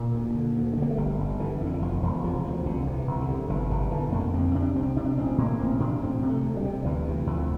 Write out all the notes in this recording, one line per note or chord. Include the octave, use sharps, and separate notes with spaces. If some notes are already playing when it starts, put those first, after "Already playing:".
Already playing: A#2 A#3
D2
D3
D2
D3 A#3
A3
G1 G3
G1
D3 E3
F2 D3
E3
E1 F3
E1 F3
C3 F3
D2 F3
C2 D3
C3
E3
C2
D3
C3
G1 E3
E3
G1 D3
D3 E3
F2 A#3
C2 C4
C3 D4
C2 C4
C3 D4
A1 C4
A2 A#3
A1 C4
A2 D4
D2 C4
C3
A3
D2
G3
C3
D2 E3
C3
E3
D2 F3